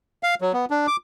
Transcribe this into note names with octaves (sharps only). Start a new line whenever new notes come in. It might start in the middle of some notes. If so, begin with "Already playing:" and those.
F5
F#3
B3
D4
D6